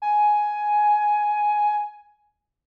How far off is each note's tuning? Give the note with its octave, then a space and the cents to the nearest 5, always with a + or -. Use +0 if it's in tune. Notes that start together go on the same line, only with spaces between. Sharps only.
G#5 +10